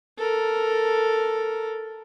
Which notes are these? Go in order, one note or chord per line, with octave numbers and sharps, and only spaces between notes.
A4 A#4